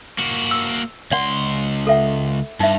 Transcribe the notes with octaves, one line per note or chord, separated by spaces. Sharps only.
A#3 F#4
E6
C#2 D5 F#5 C6
A4 E5 F#5
G2 D#4 E5